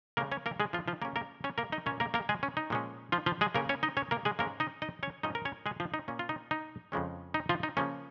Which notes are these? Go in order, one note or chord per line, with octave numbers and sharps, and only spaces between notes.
C#3 G#3 A#3 C#4 A#4
C#4 C#5
A#3 A#4
G#3 G#4
F3 F4
F3 F4
C#3 A#3 C#4 A#4
A#3 A#4
C#4 C#5
A#3 A#4
D#4 D#5
A#2 A#3 C#4 C#5
A#3 A#4
A#3 A#4
G#3 G#4
C#4
D#4
A#2 F3 G#3 C#4
F3 F4
F3 F4
G#3 G#4
C#3 A#3 C#4 A#4
C#4 C#5
D#4 D#5
C#4 C#5
A#3 A#4
G#3 G#4
G#2 G#3 A#3 C#4 A#4
D#4 D#5
D#4 D#5
C#4 C#5
G#2 F3 C#4 D#4 D#5
A#4
C#4 C#5
G#3 G#4
F3 F4
D#4
A#2 A#3 C#4
F4
D#4
D#4
F2 C#3 F3 G#3 C#4
D#4
F3 F4
D#4
C#3 F3 A#3 C#4